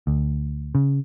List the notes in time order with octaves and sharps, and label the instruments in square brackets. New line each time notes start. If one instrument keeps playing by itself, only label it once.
[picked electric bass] D2
C#3